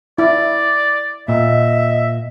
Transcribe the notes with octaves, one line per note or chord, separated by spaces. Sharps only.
E4 D5
A#2 D#5 E5